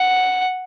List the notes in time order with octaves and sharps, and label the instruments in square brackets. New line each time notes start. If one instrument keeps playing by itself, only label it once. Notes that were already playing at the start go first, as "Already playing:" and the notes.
Already playing: [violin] F#5